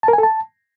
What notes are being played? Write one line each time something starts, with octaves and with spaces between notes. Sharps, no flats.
A5
A#4
G#5
A4
A5